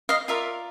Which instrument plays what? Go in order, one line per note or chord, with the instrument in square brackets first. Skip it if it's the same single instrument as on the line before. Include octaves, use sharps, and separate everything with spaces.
[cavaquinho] D#5 F5
F4 A#4 D5 E5